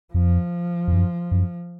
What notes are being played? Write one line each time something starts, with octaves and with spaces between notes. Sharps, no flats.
F2 F3
F2
F#2
F#2